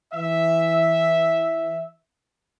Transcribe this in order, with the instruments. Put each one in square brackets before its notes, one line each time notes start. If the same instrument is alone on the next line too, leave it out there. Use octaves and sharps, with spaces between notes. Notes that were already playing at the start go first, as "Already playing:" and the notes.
[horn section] E3 E5